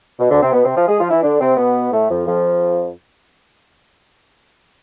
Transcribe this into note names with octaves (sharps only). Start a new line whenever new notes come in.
B2
D2 D3
C3 C4
B2 B3
C3 C4
F3 F4
G#3 G#4
F3 F4
E3 E4
D3 D4
C3 C4
B2 B3
A2 A3
F2 F3
F2 F3